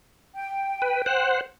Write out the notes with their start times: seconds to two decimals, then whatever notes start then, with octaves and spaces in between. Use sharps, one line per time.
0.35 G5
0.82 B4
1.06 C5 F#5